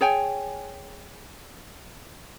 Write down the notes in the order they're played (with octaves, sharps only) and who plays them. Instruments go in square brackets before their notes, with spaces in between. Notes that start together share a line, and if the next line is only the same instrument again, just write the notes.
[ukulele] G#4 C#5 G5 G#5